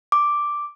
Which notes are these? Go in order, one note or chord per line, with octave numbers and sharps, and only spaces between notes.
D6